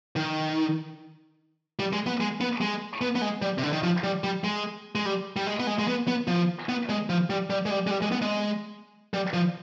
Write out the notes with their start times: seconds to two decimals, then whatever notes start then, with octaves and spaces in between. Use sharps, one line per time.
0.16 D#3
1.79 G3
1.93 G#3
2.07 B3
2.20 G#3
2.41 B3
2.61 G#3
3.01 B3
3.15 B3
3.22 G#3
3.42 G3
3.58 C3
3.63 D3
3.73 D#3
3.83 F3
4.04 G3
4.24 G3
4.44 G#3
4.95 G#3
5.06 G3
5.36 G3
5.47 G#3
5.60 B3
5.67 G#3
5.79 G#3
5.88 B3
6.08 B3
6.28 F3
6.69 B3
6.89 G#3
7.10 F3
7.30 G3
7.50 G3
7.66 G#3
7.71 G3
7.87 G#3
7.91 G3
8.02 G#3
8.12 B3
8.22 G#3
9.14 G3
9.33 F3